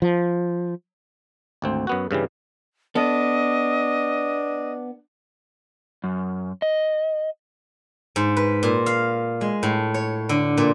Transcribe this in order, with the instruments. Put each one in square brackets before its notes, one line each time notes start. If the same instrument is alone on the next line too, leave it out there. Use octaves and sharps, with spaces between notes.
[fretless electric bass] F3
[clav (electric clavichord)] G#1 D2 C4
F#2 B3 F#4
G2 C#3 E3 G3
[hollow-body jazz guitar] B3 A4 [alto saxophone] D4 [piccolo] D#5
[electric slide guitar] F#2
D#5
[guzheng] G#2
B4
A#2
F5
G#3
A2
C#5
D3
A#2